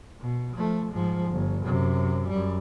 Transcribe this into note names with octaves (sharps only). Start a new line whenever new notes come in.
B2
F3 A3
G#2 F3
G1
F#2 C3
F#2 G3